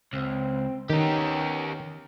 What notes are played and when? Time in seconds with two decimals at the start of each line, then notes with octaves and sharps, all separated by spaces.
0.13 C#2 C4
0.90 D#3 B3 C#4 G4 A#4